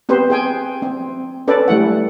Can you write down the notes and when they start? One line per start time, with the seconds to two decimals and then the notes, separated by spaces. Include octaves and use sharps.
0.09 B3 C4 G4 B4 C5
0.30 G#4 G5 G#5
0.82 C4
1.48 C#4 A4 B4 D5
1.68 G3 A3 E4 F#5